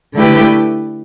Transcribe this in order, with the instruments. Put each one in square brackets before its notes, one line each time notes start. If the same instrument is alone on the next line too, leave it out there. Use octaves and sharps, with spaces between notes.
[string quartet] D3 A3 E4 G4 B4